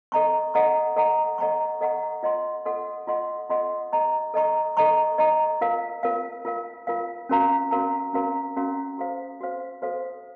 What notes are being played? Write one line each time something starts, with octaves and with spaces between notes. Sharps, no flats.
A4 D#5 A#5 C#6
A4 D#5 F#5 A#5 C#6
A4 D#5 F#5 A#5 C#6
A4 D#5 F#5 A#5 C#6
A4 D#5 F#5 A#5 C#6
F4 A4 D#5 F#5 C6
F4 A4 D#5 F#5 C6
F4 A4 D#5 F#5 C6
F4 A4 D#5 F#5 C6
A4 D#5 A#5 C#6
A4 D#5 A#5 C#6
A4 D#5 A#5 C#6
A4 D#5 A#5 C#6
F4 A#4 F5
F4 A#4 F5
F4 A#4 F5
F4 A#4 F5
C#4 F#4 A#4 F5 A#5
C#4 F#4 A#4 F5 A#5
C#4 F#4 A#4 F5 A#5
C#4 F#4 A#4 F5 A#5
F#4 A4 C5 F5
F#4 A4 C5 F5
F#4 A4 C5 F5